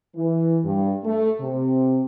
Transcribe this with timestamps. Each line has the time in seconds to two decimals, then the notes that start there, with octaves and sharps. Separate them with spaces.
0.15 E3
0.63 G2
1.04 A3
1.40 C3